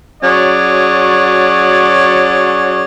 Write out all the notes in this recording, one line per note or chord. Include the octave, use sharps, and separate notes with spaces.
F#3 C#4 F#4 G#4 C#5 D5